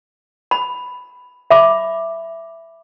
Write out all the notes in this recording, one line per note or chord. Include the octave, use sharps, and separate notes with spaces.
B5
E5 B5 D6